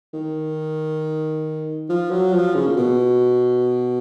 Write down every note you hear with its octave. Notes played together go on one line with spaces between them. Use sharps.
D#3
F3
F#3
F3
C#3
A#2
B2